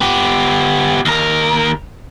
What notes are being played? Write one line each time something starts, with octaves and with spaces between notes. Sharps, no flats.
B3 G4
D#2 A#4